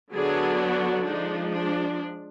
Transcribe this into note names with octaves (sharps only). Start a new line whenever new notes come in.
D3 F#3 B3 D4 G#4
F#4
F3 G#3 D4 D#4
D4